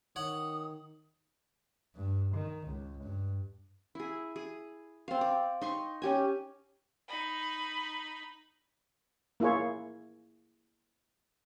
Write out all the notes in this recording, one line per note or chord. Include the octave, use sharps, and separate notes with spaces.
D#3 C#5 F#5 D#6
G2
D#3
C#2
G2
E4 G#4
G#4
C4 F5
D5
D#4 C6 C#6
C#4 G4 G#5
D#4 B5
A#3 E4 F4 G#4 C#5